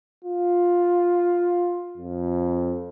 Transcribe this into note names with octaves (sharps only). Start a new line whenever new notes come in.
F4
F2